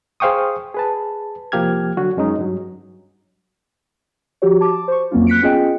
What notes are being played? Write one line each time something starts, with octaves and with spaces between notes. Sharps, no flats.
G#4 C5 F5 G5 C#6 D#6
G#4 B4 A5
C2 F3 A#3 G4 F6 G#6
D3 F#3 F#4
F#2 G#3 C#4 D#4
G2 F#3
F3 F#4 G4 C#5
A5 D6
C5 C#6
F2 F#3 A#3 C4 C#4 F4
F#6 B6 C#7 D7
B3 C#4 F4 G#4 D#5 G5